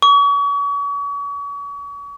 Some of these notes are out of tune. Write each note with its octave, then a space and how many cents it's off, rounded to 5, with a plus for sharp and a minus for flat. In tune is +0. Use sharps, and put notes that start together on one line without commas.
C#6 +40